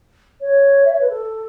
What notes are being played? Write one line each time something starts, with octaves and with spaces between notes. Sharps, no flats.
C#5
E5
C#5
B4
A4